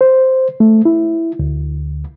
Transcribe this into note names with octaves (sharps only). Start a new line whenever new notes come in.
C5
A3
E4
D2